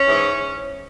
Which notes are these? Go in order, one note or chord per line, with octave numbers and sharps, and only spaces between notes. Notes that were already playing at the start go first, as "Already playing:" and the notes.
Already playing: C#4
G#2 E3